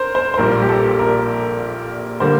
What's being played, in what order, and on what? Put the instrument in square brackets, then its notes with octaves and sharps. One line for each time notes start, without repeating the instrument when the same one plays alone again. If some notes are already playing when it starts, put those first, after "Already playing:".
Already playing: [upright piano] A#4 C5
C5
C5
A#1 A#2 G3 A#4
G4
A4
A#4
D3 G3 A#3 C5